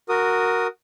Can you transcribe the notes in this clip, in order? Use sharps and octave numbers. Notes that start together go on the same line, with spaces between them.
F#4 A#4 D#6